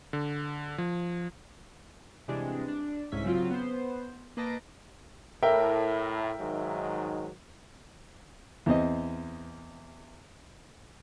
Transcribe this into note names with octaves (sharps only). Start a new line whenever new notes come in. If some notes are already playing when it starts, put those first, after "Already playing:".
D3
F3
C3 E3 G3 G#3 D4
D4
C2 G#2 C#4 E5 B6
C#3 F#3 C4 F4
B3 C5
A#3 B4 D#5 A5 A#6 D7
A2 A#4 E5 G5
G#2 D#3 F#3
E2 C4 D#5